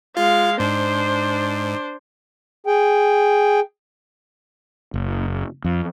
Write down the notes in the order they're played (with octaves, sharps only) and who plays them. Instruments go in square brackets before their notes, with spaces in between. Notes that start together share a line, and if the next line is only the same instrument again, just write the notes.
[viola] G#3 F5 [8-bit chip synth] F4
[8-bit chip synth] G#2 [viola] D4 C5
[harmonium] G#4 G5
[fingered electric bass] F#1
F2